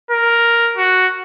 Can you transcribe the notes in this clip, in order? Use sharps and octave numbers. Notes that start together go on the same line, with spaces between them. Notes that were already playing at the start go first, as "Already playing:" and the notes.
A#4
F#4